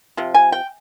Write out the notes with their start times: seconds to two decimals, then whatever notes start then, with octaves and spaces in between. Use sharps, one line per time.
0.17 C3 F3
0.34 G#5
0.52 G5